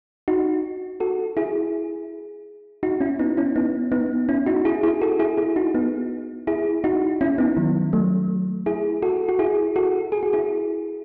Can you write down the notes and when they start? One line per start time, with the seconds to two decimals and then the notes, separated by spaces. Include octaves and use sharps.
0.28 D#4 F#4
1.00 F#4 A4
1.37 E4 G#4
2.83 D#4 F#4
3.00 C#4 E4
3.19 B3 D#4
3.37 C#4 E4
3.56 B3 D#4
3.92 B3 D#4
4.29 C#4 E4
4.46 D#4 F#4
4.65 E4 G#4
4.83 E4 G#4
5.02 F#4 A4
5.19 E4 G#4
5.37 E4 G#4
5.56 D#4 F#4
5.74 B3 D#4
6.47 E4 G#4
6.84 D#4 F#4
7.21 C#4 E4
7.38 B3 D#4
7.57 D#3 F#3
7.93 F#3 A3
8.66 E4 G#4
9.02 F#4 A4
9.29 F#4
9.39 E4 G#4
9.76 F#4 A4
10.12 G#4
10.23 F#4
10.33 E4 G#4